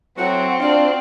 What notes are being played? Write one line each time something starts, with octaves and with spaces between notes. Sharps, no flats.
F#3 A3 C4 E4 F#4 F#5
D4 F4 F#4 D5 F5